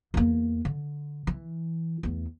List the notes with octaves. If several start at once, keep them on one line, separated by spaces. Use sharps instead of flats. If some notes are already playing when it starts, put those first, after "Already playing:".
E2 A#3
D3
E3
E2 A3